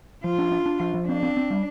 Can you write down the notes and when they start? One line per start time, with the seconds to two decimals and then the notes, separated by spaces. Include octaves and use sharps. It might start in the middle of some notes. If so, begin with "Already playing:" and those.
0.24 F3 F4
0.38 D4
0.52 D4
0.66 D4
0.80 F3
0.94 F3
1.08 C4 D4
1.23 C4
1.37 C4
1.50 G3